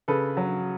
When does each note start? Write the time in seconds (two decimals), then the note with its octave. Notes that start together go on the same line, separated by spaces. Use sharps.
0.08 C#3 A4 B4
0.37 F#3